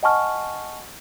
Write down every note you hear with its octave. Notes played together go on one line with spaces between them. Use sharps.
D#5 F#5 G#5 A5 C#6 F6